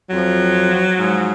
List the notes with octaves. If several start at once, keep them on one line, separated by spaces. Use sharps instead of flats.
F2 F#3
F3
G#2 F3